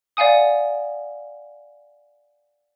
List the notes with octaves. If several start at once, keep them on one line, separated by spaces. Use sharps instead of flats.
D5 F5 F#5 G#5 D#6